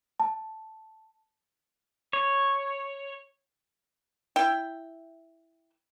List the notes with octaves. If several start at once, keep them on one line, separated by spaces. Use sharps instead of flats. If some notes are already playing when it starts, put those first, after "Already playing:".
A5
C#5
E4 G5